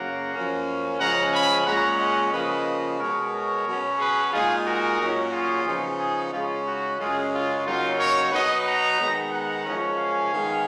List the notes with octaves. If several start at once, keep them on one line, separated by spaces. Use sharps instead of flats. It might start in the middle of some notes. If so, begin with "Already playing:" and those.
Already playing: F#2 C#3 F#3 A#3 F#5 A#5
F#2 F3 A#3 C#4
C#3 F3 G#3 C#4 F#5 A#5
G#5 B5
A#2 G#3 C#4 F#5 A#5
D#5 F#5
C#3 F3 A#3 B4 D#5
B2 G#3 B3 A#4 C#5
A#4 C#5
B2 F#3 C#4
G#4 B4
A#2 G#3 D#4 F4 G#4
F#4 A#4
A#2 F#3 C#4
F4 G#4
C#3 F3 B3 D#4
F4 G#4
C#3 G#3 C#4 F4
D#4 F#4
F#2 C#3 G#3 C#4 F4 G#4
F4
C#3 F#3 A#3 D#4 F4
A#4 C#5
B2 F#3 B3 D#4 B4 D#5
F#5 A#5
D#3 G#3 B3 D#4
F#5 A#5
F#2 F3 G#3 C#4
F5 G#5
D#3 G#3 B3